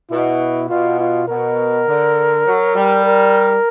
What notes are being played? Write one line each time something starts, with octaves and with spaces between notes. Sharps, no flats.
B2 E4
B2 F4
F4
B2 A#4
D3
F#3
G3
A#4